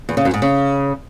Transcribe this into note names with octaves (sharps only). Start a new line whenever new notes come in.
E2
C#3
F#2
G#2
C#3